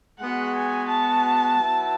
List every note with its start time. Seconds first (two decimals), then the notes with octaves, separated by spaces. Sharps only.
0.20 G#3 B3 F#4 F#5
0.55 G#5
0.89 A5
1.57 F#3 B3 E4